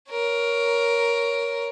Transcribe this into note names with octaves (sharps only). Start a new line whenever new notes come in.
A#4 C#5